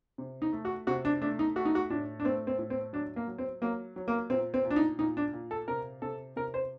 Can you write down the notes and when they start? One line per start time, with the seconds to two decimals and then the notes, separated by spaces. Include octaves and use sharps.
0.18 C3
0.42 D#4
0.52 A3
0.65 F#4
0.87 C3 F#4
1.05 D4
1.22 A3 D4
1.39 D#4
1.56 A3 F#4
1.65 D#4
1.75 F#4
1.90 A2 D4
2.20 D4
2.24 A3 C4
2.47 C4
2.59 A2
2.70 C4
2.93 F#3 D4
3.16 A#3
3.27 F#3
3.39 C4
3.62 F#3 A#3
3.96 F#3
4.08 A#3
4.30 A#2 C4
4.54 C4
4.65 A#2
4.70 D4
4.76 D#4
4.99 A#2 D#4
5.17 D4
5.33 A#2
5.51 A4
5.68 C3 A#4
6.02 C3 A4
6.36 C3 A#4
6.54 C5